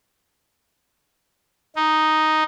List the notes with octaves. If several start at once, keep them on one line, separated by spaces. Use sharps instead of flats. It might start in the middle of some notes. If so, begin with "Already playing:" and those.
D#4